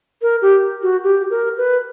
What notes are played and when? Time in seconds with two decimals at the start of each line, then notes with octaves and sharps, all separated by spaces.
0.22 A#4
0.42 G4
0.83 F#4
1.04 G4
1.30 A#4
1.57 B4